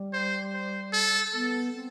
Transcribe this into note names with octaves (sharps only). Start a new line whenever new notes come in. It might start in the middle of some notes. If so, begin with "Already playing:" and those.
Already playing: G3
C5
C5
A4
B3 A4
C4